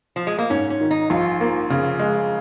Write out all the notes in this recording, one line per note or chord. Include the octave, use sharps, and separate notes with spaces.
F3
G#3
A#3
G#2 C#4
C#4
D#3
D#4
A#1 F4
A#3
C#3
G#3